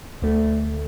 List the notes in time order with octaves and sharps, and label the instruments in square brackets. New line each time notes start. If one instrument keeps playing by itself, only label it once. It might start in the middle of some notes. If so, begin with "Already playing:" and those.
[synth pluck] D2 A3